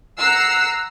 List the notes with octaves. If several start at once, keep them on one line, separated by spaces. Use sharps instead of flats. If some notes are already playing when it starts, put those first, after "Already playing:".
F#5 A#5 E6 C7